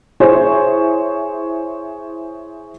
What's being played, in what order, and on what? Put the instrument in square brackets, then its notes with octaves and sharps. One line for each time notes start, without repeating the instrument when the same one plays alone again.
[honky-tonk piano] E4 G#4 C5 C#5